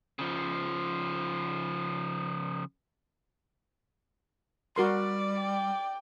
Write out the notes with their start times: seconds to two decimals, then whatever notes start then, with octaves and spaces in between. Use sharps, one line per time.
0.19 C#3 F3
4.76 G3 F#4 A#4 D5 C6
5.40 G5